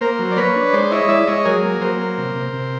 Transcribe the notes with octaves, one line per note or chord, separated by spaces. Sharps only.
A#3 A#4 C5
F#3
D5
A#3 B4 C#5
D4
G#3 C5 D5
E4 C#5 D#5
G#3 D5 E5
G#3 C#5 D#5
F#3 G#4 A#4
A#3
F#3 A#4 C5
A#3
C3
C3
C3